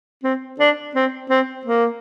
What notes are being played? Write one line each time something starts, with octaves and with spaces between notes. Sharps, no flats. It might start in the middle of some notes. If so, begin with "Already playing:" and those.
C4
D4
C4
C4
A#3